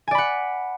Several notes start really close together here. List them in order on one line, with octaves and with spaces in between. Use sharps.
G#5 D5 B5 F#5